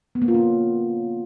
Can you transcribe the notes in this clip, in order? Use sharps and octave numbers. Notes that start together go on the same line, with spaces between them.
B3
A#3
F4
C#4